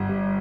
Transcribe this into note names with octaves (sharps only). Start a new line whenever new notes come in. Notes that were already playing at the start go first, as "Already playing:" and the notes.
Already playing: G1 G2
G3